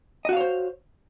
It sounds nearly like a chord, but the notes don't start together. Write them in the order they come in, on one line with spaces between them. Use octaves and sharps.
D#5 F#4 F5 C#5 C5